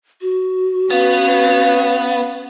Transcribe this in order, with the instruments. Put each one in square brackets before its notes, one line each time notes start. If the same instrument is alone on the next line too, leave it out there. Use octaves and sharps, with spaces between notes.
[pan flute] F#4
[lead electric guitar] B3 [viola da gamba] C#4 B4 [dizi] F5